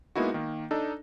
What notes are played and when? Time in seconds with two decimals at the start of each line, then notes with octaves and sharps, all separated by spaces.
0.15 G#3 A#3 B3 D#4 E4 F#4
0.34 D#3 A#3
0.71 D4 D#4 A4